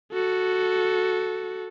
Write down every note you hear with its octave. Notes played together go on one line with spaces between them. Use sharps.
F#4 A4